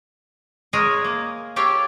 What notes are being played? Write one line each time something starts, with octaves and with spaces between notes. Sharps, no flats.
G#3 G#4 A#4 C#5 D#5
A#3
G4 A4 C#5 F5 G5